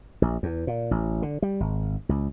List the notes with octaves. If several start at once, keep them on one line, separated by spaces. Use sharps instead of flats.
A#1
E2
A#2
A1
D3
G3
G#1
C#2